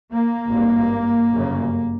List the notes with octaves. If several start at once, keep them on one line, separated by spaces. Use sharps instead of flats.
A#3
G#1 G2
G1 F#2 C#3